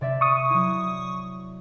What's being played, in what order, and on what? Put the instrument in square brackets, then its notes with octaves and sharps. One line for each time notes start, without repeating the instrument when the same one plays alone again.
[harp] C3 D5 E5
[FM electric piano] C#6 D#6
[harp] F#3 E4